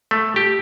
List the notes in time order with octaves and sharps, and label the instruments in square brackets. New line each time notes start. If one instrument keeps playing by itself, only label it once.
[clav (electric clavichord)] A3
G4